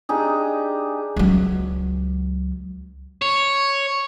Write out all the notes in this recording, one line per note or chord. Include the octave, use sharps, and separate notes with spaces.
D4 D#4 G4 G#4
C#2 F#3
C#5